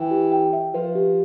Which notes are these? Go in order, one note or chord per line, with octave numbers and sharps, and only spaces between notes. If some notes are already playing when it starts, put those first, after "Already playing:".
Already playing: E3 G5
G4
G5
E5
F3 B4
G4